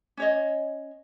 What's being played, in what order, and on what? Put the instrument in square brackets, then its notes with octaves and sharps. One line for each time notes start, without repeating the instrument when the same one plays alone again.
[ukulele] C#4 C#5 D#5